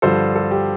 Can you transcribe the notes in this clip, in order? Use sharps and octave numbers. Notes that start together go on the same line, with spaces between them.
G2 D3 F3 A4 C5
A4
G4